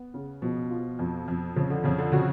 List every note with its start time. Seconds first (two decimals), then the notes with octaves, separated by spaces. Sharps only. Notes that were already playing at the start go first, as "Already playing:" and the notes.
Already playing: B3
0.14 C#3
0.42 B2 F3
0.70 F4
0.99 F2
1.28 F2
1.56 C#3 F3
1.70 D3
1.84 F2 C#3
1.98 D3
2.12 C#3 F#4